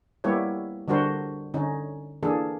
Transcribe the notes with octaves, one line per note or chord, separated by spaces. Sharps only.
G3 A#3 B3 E4 G4 C#5
D3 G3 D4 F#4 A#4 C5
D3 C#4 D#4
E3 A#3 D4 G#4 A4